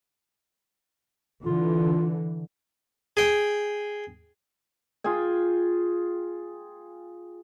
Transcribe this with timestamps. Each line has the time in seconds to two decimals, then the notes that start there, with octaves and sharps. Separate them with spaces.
1.45 D3 E3 F4
3.17 G#4 G5
5.04 F4 G#4 G5 G#5